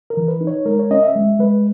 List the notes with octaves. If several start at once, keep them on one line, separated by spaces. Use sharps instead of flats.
A#4
E3
B4
D#4
C#5
G#3 A#4
C#5
C#4 D#5
E5
G#3
G#3 B4